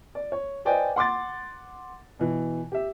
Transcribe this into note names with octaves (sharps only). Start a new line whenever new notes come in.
D5
C#5
B4 C5 D5 D#5 G5 G#5
F#5 C6 D6 A6
B2 E3
G4 E5